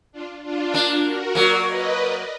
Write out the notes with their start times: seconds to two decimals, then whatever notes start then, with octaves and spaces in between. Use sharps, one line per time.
0.12 D4 F4
0.44 D4 F4
0.74 A#3 D4
1.05 F#4 A#4
1.35 F#3 A#3 A#4 D5
1.66 B4 D#5
1.97 A#4 D5